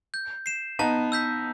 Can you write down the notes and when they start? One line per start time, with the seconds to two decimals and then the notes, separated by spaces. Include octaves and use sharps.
0.14 G6
0.46 C7 E7
0.79 B3 D#4 A5
1.12 E6 G6 B6